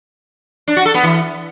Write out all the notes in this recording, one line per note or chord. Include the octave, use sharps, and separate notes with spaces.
D4
F#4
A4
B3
E3